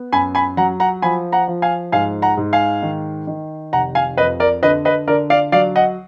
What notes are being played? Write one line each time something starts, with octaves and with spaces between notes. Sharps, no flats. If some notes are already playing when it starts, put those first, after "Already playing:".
Already playing: B3
F#2 G#5 B5
G#5 B5
F#3 F#5 A#5
F#5 A#5
F3 G#5 B5
F#5 A#5
F3
F5 G#5
G#2 F5 G#5
F#5 A#5
G#2
F5 G#5
D#3
D#3
F1 F#5 A#5
F5 G#5
F2 B4 D#5
A#4 D5
D3 B4 D#5
B4 D#5
D3 A#4 D5
D5 F5
F#3 D5 F5
D#5 F#5